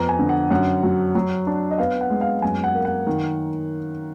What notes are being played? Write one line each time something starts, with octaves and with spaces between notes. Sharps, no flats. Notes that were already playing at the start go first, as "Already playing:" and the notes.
Already playing: F2 B3 A#5
G#5
D3
F#5
F#2 F#5
F#3
F#3
D4
D#5
B3 F5
F#5
G#3
F5
F#2 G#5
F#5
A#3
F#5
D#3